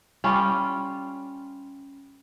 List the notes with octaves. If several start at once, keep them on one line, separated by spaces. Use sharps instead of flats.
G3 C#4 F4